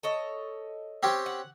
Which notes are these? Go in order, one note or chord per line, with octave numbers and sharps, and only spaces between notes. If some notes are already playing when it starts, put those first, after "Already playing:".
A4 C#5 D#5
C4 C#4 G4
F#5